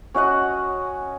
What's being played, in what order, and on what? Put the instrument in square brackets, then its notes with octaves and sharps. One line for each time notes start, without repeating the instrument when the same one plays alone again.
[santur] C#4 F#4 D#5 F#5